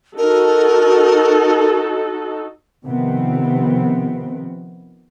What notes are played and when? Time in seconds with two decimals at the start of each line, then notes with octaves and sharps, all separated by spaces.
0.18 D#4 F#4 A4 A#4
2.84 C3 D#3 F3 B3 C4